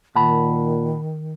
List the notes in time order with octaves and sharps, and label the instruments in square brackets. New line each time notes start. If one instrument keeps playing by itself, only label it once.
[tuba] A#2 [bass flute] D#3 [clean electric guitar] F#5 A5 B5